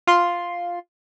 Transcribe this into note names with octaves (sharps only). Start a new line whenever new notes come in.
F4 C6